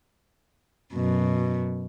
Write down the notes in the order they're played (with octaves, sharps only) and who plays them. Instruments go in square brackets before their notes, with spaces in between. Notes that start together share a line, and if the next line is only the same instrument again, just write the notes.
[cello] F#2 B2